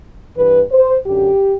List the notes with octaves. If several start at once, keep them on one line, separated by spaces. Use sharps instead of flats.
G2 E3 B4
C5
F#2 D3 G4